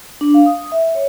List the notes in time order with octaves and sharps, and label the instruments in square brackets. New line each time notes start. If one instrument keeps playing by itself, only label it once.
[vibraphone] D4
F5
D#6
E5
C#5